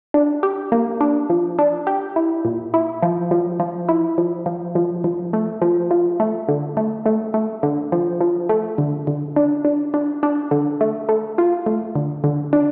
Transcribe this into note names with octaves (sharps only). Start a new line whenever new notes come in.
D4
G4
A#3
D4
F3
D4
G4
E4
A#2
E4
F3
F3
F3
E4
F3
F3
F3
F3
A3
F3
F3
A3
D3
A3
A3
A3
D3
F3
F3
A3
D3
D3
D4
D4
D4
D4
D3
A3
A3
F4
A3
D3
D3
D4